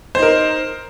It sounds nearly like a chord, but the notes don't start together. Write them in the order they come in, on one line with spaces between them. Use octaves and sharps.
C5 D#4 A#4